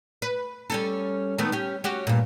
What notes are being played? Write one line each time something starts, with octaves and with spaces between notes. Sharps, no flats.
B4
G3 C#4 A4
D#3 A3 B3
C#4 G4
C#4 F#4 G4
G2 A#2